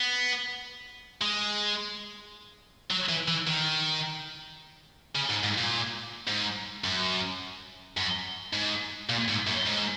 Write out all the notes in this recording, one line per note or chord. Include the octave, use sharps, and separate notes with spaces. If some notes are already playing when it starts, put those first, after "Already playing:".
Already playing: B3
G#3
F#3
E3
E3
D#3
C#3
G#2
G#2
A#2
G#2
F#2
F#2
G#2
A#2
G#2
F#2
G#2